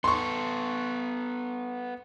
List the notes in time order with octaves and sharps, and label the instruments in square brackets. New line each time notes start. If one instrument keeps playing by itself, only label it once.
[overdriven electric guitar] B3 A4 [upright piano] C6 C#6